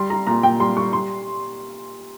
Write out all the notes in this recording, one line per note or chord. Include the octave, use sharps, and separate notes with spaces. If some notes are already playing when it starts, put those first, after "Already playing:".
Already playing: G3 C6
G3 A#5
A#2 A#5
A#2 G5
G3 C6
G3 C#6
G3 C6